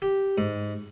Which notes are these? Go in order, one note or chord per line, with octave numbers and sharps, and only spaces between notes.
G4
G#2